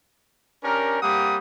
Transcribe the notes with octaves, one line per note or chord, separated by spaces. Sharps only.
C#4 D4 G4 A#4
G3 A#3 C4 G4 F#5 D#6